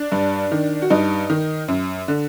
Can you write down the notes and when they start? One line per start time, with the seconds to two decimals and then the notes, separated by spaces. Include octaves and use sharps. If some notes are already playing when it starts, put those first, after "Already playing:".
Already playing: D4
0.12 G2
0.52 D#3
0.82 F#4
0.90 G2 D#4
1.30 D#3
1.68 F#2
2.08 D3